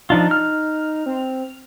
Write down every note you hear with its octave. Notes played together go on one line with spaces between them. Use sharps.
F3 D4 D#4 F4
F6
C4